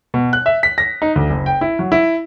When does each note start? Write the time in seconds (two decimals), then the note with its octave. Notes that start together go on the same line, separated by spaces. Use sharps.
0.14 B2
0.33 F#6
0.46 E5
0.63 B6
0.78 A#6
1.02 D#4
1.16 D2
1.30 F#1
1.46 G5
1.61 E4
1.79 F#3
1.92 E4